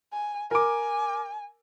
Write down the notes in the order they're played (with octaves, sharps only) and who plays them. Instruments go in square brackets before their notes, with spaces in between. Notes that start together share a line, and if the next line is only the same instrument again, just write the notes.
[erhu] G#5
[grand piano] A#4 D6 [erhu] G#5